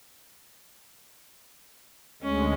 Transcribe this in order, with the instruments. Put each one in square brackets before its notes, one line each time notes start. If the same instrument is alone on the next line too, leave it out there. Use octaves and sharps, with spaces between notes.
[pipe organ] D2 G#3 [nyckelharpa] C#4